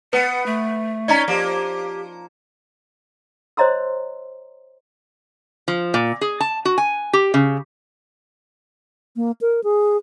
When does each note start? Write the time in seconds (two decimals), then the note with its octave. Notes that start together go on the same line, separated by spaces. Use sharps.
0.13 B3 B4 F#5
0.46 A3
1.08 C#4 D#4 D5 D#5 A#5
1.28 F3 A#3 G4
3.57 C5 C#5 D#5 A#5 C6 E6
5.68 F3
5.94 A#2
6.21 G#4
6.40 A5
6.65 F#4
6.78 G#5
7.13 G4
7.34 C#3
9.16 A#3
9.41 A#4
9.64 G#4